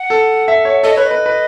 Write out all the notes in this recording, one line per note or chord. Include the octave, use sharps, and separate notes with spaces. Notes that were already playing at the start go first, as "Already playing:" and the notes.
Already playing: F#5
A4
E5
C#5
A4 D#5
B4 C#5
D#5
B4
B4